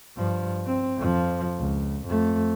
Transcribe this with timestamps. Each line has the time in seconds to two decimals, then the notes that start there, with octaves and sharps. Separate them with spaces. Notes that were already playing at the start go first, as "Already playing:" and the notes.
0.16 G2 F3
0.66 C4
0.97 F2 F3
1.58 C#2
2.07 F2 A3